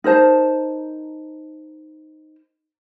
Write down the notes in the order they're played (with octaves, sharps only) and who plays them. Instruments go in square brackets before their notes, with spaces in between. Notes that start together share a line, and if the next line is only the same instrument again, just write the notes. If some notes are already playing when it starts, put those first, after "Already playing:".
[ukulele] D#4 A#4 C5 A5